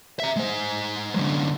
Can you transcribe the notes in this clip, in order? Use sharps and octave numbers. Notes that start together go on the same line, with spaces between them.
E5 A#5
G#3 C5
F#2 D3